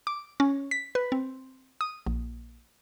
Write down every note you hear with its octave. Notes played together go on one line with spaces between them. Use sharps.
D6
C#4
B6
B4
C4
D#6
A#1